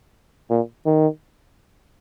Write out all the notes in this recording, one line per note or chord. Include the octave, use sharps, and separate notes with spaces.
A#2
D#3